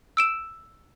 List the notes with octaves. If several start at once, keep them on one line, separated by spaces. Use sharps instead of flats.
E6 D7 E7